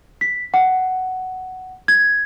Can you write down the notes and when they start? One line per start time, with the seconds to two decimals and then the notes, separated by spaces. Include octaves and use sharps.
0.21 B6
0.54 F#5
1.88 G#6